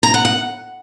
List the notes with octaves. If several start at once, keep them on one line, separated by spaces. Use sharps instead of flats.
A#5
F#5
F#5